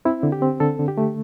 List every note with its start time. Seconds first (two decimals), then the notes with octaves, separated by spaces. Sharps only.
0.05 C4 E4
0.23 D3
0.32 G4
0.42 C4
0.60 D3 A4
0.79 D3
0.88 G4
0.98 A3